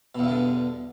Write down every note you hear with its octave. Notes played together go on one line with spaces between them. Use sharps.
E2 G2 B2 D3